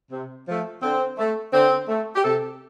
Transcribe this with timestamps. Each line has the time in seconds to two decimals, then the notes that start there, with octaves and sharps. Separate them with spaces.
0.12 C3
0.47 F3 A3
0.82 D3 C4
1.18 A3
1.53 D3 C4
1.88 A3
2.15 G4
2.24 C3 A4